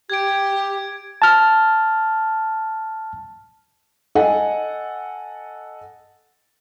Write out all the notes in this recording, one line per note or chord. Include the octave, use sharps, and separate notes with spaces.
G4 G#6 D7
A5 F6
A4 D#5 F#5 G#5